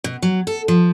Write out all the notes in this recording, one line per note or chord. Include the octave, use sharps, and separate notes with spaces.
B2
F#3
A4
F3